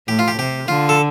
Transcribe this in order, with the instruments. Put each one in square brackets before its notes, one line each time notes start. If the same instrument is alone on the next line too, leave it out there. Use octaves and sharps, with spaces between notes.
[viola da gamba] A2 [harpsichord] G4
[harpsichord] F4
G4
[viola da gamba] C3 [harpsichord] G4
[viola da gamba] D3 [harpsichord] F4
[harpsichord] A4